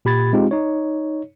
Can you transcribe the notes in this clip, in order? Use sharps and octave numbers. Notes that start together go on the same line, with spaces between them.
A#2 G4 B5 G#6 A6
G#3 C4 D#4 F4 G4
D#4 C#5